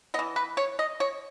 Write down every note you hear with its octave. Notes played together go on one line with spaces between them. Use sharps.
E3 B3 D#5
B4
C#5
D#5
C#5